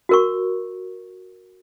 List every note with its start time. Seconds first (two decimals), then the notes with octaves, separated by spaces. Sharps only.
0.09 F#4 A#4 C#6